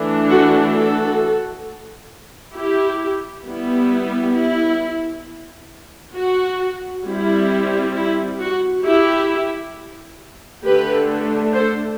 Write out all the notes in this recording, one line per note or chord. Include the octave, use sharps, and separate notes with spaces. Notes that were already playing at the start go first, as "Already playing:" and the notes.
Already playing: E3 A3 D4
F#4 A4
F#4 A4
E4 G4
G3 B3 E4
E4
F#4
G3 C4 E4
E4
F#4
E4 G4
D3 A3 D4 G4 B4
A4 C5